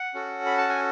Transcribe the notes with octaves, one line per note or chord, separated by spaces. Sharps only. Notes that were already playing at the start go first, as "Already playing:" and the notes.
Already playing: F#5
C#4 F#4 A4
B5
A5
G#5